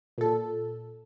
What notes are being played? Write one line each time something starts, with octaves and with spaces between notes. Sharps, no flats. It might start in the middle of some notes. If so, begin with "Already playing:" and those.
A#2 A4